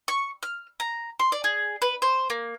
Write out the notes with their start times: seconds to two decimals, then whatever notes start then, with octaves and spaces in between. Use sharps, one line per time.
0.08 C#6
0.43 F6
0.80 A#5
1.20 C6
1.32 D5
1.44 G#4
1.82 B4
2.02 C5
2.30 A#3